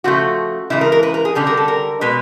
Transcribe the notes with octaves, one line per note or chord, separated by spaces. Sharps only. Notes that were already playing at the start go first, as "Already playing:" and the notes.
C#3 F3 A3 F#4
C#3 E3 G#3 E4
A#4
A#4
B4
A#4
G#4
D3 G3 A4
A#4
A4
A#4
B2 G#3 B4